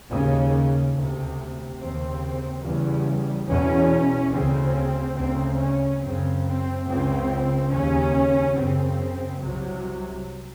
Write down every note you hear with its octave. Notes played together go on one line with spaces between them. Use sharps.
D#2 C#3
D2 C3
D#2 C#3 C4
E2 C#3 G3
E2 B2 C#4
D2 C#3 C4
D2 C#3 C4
C#4
F#2 C#3 C4
C4
C#2 C#3 C4
D#2 C#3 C#4
F#2 C#3 C4
C2 C3 F#3